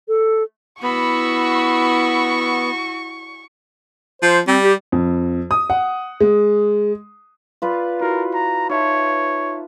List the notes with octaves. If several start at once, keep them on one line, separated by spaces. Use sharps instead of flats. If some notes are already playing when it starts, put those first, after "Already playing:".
A4
B3 E4 F#4 B5 C#6 E6
F3 C5
G3 C4
G4
F2
D#6
F#5
G#3
F4 B4 D5
E4 F#4 A#4
A#5
D#4 C#5 E5 A5